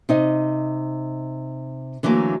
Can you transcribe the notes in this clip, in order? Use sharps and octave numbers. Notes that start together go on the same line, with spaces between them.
C3 D#4 D#5
D3 E3 F#3 A3 A#3